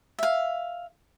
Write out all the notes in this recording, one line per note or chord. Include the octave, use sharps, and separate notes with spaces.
E5 F5